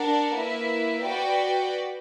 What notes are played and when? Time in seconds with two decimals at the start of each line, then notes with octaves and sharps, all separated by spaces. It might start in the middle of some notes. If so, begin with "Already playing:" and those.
Already playing: D4 A#4 D5 F#5
0.35 A#3 E4 B4 E5
1.04 F#4 B4 D5 G5